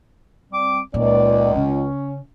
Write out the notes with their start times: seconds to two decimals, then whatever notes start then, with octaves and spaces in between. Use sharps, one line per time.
0.51 G3 C4 D6
0.94 C#2 A#2 D#3 C#4 D5
1.55 C#3 C#4